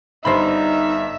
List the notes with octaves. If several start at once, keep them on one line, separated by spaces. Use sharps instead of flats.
G1 G2 D#4 C5 E5 B5